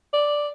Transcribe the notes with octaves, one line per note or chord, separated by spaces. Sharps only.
D5